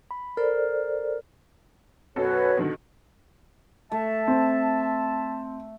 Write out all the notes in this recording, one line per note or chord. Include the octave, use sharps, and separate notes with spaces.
B5
A4 A#4 C5 D5
F#2 B2 F#4 A4 B4 C#5
B2 D3 D#3
A3 E5 A5
C4